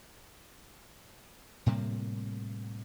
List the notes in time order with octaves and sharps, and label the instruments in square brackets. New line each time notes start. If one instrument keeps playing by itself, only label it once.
[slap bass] A2 C3 G3 A#3